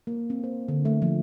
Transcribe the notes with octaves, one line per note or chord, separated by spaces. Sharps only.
A#3
C4
C5
D3
A3
F3